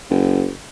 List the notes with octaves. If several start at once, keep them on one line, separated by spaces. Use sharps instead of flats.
F#1